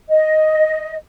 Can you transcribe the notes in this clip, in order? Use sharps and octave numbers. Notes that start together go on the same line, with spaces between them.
D#5